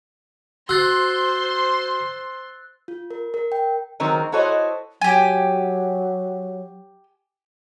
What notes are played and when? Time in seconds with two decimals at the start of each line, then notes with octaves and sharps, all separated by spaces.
0.69 F#4 C5 C6 E6 F#6 A6
2.88 F4
3.11 A#4
3.34 A#4
3.52 G5
4.00 D#3 F#3 G#3 C4 A#4
4.32 E4 F#4 A4 C5 C#5 D#5
5.01 F#3 G4 G#5